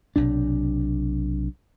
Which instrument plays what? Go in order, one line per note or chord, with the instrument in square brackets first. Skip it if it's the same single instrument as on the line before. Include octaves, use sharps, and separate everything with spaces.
[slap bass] B1 C3 D4